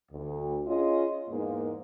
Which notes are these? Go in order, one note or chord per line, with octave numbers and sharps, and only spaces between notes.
D2
C#4 F4 G#4 C#5 D#5
E2 G#2 A#3